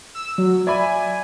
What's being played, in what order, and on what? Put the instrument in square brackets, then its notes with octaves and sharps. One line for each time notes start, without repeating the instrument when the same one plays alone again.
[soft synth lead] E6
F#3
[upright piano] D5 E5 B5 [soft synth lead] G#5